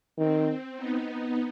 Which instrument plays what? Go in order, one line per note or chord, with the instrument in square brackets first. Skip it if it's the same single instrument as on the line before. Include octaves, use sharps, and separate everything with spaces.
[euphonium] D#3 [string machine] C4
[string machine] B3 D#4